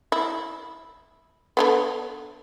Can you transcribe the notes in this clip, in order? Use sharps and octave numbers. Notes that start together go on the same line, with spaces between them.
E4
D3 D#3 B3